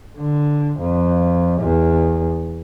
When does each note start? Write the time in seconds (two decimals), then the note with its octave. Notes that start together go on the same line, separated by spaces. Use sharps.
0.19 D3
0.80 F2
1.61 E2